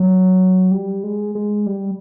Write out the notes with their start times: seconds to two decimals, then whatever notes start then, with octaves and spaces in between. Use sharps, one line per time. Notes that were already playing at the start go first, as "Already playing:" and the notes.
Already playing: F#3
0.71 G3
1.03 G#3
1.35 G#3
1.66 G3